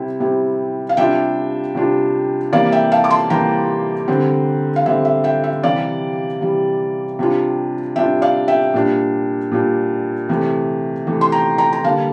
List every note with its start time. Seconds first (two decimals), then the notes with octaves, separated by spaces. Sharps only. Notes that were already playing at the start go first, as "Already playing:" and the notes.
Already playing: C3 G3 C4 E4
0.20 C3 G3 C4 E4
0.89 F5
0.97 C3 G3 D4 F4 E5 G5
1.75 C3 G3 D4 F4
2.53 C3 E3 G3 A#3 D5 F5
2.72 E5 G5
2.92 F5 A5
3.04 D6
3.10 A5 C6
3.30 C3 E3 G3 A#3 G5 A#5
4.08 D3 G3 C4
4.76 F5
4.86 D3 G3 C4 E5
5.05 E5
5.24 E5 G5
5.44 E5
5.63 C3 E3 G3 D5 F5
6.41 C3 E3 G3
7.19 C3 G3 D4 F4
7.96 C3 G3 D4 F4 E5 G5
8.22 D5 F5
8.48 E5 G5
8.74 A#2 G3 D4
9.52 A#2 G3 D4
10.29 C3 E3 A3
11.07 C3 E3 A3
11.21 C6
11.32 G5 A#5
11.58 G5 A#5
11.73 A#5
11.84 D3 G3 A#3 F5 A5